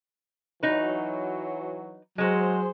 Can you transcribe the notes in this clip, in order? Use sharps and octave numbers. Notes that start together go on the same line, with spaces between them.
E3 F#3 D#4 B4
F#3 G#3 F#4 G#4 C5